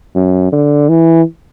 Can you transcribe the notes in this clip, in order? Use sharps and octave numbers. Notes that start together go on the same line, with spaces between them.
F#2
D3
E3